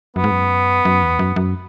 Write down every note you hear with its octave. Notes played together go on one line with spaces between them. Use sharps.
F#2 B3
G#2
F#2
F#2
E2
F#2
F#2